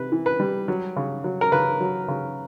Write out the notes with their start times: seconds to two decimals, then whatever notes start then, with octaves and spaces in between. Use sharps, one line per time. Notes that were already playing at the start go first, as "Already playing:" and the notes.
Already playing: C3 B4
0.12 E3
0.26 B4
0.40 G3
0.68 F#3
0.96 C#3
1.24 F#3
1.41 A#4
1.52 C#3 B4
1.81 F#3
2.08 C#3